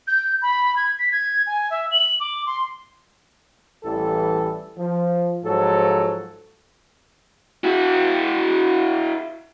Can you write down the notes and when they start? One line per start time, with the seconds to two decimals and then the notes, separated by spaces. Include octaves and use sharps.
0.07 G6
0.42 B5
0.76 G#6
0.99 B6
1.12 G#6
1.47 G#5
1.70 E5
1.91 F#7
2.20 D6
2.46 C6
3.84 A1 E3 G3 A4
4.78 F3
5.44 G#2 F3 F#3 A4
7.64 E4 F#4